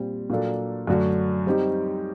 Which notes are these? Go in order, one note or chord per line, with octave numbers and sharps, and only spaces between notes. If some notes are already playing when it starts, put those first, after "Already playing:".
Already playing: A#2 G3 C4
A#2 F#3 A#3 D4 A4
F#2 D3 A3 D4 F#4
G3 C4 D#4 G4